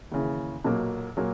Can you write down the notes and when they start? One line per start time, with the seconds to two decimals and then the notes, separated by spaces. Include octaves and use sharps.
0.12 D#2 C#3 E3
0.64 B1 A#2 F#3 A#3
1.17 A#2 F#3 A#3